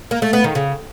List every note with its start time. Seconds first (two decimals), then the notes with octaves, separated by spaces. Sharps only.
0.11 A#3
0.22 A3
0.33 B3
0.44 D#3
0.55 C#3